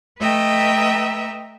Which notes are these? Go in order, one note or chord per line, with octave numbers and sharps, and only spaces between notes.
A3 B4 D#5 E5 G5 A#5